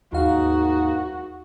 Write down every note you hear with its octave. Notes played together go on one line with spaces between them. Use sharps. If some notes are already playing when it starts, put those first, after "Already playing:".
D#2 G#2 A#3 D#4 F#4 F5